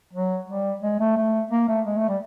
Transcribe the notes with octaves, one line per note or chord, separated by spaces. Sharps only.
F#3
G3
G#3
A3
A3
A#3
A3
G#3
A3
G3